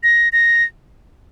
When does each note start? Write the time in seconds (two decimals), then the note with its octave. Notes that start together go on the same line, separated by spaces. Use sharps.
0.03 A#6
0.33 A#6